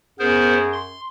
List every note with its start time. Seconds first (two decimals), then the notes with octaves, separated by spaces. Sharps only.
0.19 F#2 B3 G#4 A#4 C5
0.73 C6